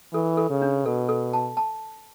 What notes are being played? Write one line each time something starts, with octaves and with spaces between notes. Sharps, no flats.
E3 A4
A4
C#3
D4
B2 A4
A4
A5
A5